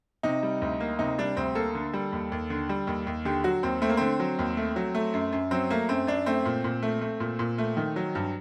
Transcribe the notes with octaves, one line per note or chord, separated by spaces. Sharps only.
C3 D#4
G3
D2
A#3
C3 D#4
G3 D4
D2 C4
A#3 A4
D3
G3
D#2
D#2
D3
G3
D#2
D#2
D3 G4
F#3 F#4
D#2 C4
A3 C4
A#3
D3 C4
F#3
D#2
A3
F#3
A3
F#2
F#2
F#3 C4
A3 A#3
F#2 C4
F#2 D4
A3 C4
A#2
A#2
A3
A3
A#2
A#2
A3
D#3
F#3
G2